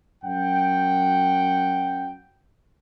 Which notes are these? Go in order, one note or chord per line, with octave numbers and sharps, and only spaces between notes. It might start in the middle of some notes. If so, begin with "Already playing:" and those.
F#2 F#3 F#5 G5